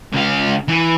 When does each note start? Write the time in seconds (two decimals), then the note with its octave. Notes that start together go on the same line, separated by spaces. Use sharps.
0.13 C#2 F5
0.68 E3